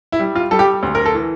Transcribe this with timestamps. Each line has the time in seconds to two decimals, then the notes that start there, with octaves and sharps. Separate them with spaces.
0.12 E4
0.19 G3
0.35 F4
0.51 G3 A4
0.59 G4
0.83 D2
0.95 A#4
1.06 A4
1.14 E3